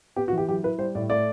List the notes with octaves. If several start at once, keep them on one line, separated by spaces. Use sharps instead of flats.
B3 G4
F#4
E3
G4
F#3 G4
E4 B4
G3 C5
A2 D5
A3 D5